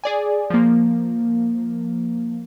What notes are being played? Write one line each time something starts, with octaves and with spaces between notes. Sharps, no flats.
G#4 D5 G#5
F3 A#3